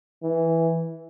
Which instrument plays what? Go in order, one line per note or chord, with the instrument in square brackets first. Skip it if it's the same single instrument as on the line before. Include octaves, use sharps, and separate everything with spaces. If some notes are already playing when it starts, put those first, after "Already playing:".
[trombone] E3